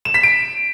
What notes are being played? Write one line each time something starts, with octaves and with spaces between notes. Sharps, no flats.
E7
B6
D7